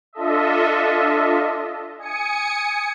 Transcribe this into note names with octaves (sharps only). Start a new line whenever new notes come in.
D4 F4 A4 D#5 E5
G#5 D#6 C#7